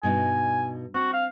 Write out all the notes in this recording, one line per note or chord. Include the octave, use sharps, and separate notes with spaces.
G2 B2 D#4 G#5
C4 F#4
F5